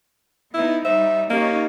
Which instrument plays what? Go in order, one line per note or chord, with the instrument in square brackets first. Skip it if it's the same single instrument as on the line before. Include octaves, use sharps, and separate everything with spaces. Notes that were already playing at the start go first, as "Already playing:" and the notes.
[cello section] B3 D#4 [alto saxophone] E4
[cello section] G3 D#4 [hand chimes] C5 [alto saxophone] E5
[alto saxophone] A#3 [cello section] C#4 D#4 [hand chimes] G4 D#5